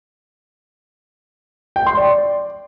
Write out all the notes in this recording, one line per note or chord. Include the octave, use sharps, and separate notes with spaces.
G5
C6
D5